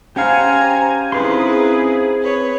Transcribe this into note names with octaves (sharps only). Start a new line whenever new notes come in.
C#4 G4 C5 F5 F#5 G#5 A#5 G#6
C4 D#4 E4 G#4 B4 A#5 C6
B4 C#5